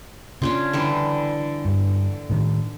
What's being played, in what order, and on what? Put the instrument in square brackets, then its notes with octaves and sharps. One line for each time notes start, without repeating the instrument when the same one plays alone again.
[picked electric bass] C#3 [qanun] C#4 D4 F4
[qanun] D3 E3 G3
[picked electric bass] G2
A2 D#3